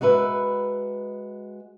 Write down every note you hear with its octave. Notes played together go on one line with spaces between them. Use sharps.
G#3 F#4 A#4 B4 E5